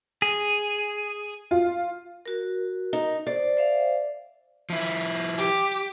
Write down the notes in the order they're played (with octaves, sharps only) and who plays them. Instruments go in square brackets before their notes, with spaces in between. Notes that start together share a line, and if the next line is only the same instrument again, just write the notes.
[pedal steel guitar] G#4
[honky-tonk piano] F4
[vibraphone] F#4 A#4
[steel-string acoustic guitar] D#4
[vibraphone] C5 [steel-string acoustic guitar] D5
[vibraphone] C5 E5 F5
[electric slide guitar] F3 E4
[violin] G4